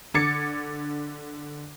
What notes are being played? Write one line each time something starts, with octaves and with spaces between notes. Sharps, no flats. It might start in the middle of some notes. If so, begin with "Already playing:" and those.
D3 D6 G#6 A6 C#7